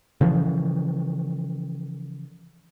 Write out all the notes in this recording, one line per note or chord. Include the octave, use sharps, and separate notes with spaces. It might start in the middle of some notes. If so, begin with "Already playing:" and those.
C#3 E3 F3